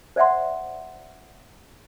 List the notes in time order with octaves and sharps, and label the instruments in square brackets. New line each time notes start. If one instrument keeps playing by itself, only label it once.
[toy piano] C5 D5 E5 F#5 C6